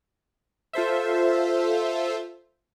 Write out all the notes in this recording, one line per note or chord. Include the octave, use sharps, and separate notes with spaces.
F4 A4 C5 E5